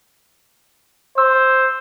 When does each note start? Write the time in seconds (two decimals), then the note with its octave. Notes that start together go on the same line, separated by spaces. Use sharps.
1.18 C5 E6